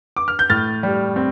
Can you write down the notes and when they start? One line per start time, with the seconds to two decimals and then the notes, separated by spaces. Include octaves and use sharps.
0.17 D6
0.28 F6
0.39 G6
0.50 A2 F6 A6
0.83 G3
1.16 C4